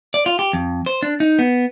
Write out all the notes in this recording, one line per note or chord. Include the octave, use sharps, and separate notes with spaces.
D5
F4
G4
F2
C5
D4
D#4
B3